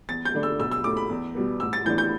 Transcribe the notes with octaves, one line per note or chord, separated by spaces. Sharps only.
E2 A6
G6
D3 A3 D4
E6
B1 E6
E6
A2 A3 D6
B5
E2
B2 G3 B3
A1 E6
A6
A2 E3 B3 D4 G6
G6